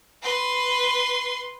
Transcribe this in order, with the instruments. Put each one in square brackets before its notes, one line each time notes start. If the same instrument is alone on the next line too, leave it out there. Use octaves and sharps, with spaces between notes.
[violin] B4 C6